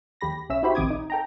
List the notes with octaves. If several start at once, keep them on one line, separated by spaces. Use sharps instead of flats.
D#2 G4 B5 A#6
B1 C#4 E5 E6
D#4 E4 F#4 G4 C5 B5
A#1 D#3 C4 D6 D#6 G#6
D#4
A4 G5 A#5